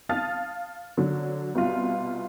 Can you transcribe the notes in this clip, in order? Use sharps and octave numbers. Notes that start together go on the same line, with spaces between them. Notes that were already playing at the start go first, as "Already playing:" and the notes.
F5 A5 D#6 F6 A6
D3 F#3
C2 B2 F4